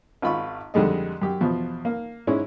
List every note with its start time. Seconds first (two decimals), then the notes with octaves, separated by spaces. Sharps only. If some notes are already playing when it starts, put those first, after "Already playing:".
0.22 G#1 F4 B5 C#6
0.74 F2 D3 G3 G#3 D#5
1.22 F#2 G4
1.41 E2 B2 F3
1.85 A#3
2.27 G#2 G#3 C#4 E4